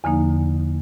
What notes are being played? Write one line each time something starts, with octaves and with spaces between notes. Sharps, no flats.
E2 D3 F3 A#3 D#4